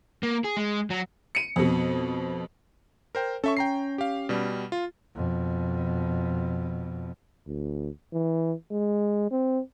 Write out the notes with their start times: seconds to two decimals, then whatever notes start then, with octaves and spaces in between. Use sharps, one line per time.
0.23 A#3
0.44 G#4
0.57 G#3
0.90 F#3
1.35 C#7 D#7
1.56 F2 B2
3.15 A#4 C5 G5
3.44 C#4 A4 E5 C#6
3.57 G5 A#5 C7
3.98 G4 F5
4.29 B2 G3
4.72 F4
5.15 F2 B2
7.47 D2
8.13 E3
8.71 G#3
9.31 C4